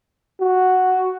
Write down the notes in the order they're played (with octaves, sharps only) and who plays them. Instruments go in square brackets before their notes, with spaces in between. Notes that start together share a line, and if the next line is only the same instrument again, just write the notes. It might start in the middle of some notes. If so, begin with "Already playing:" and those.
[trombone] F#4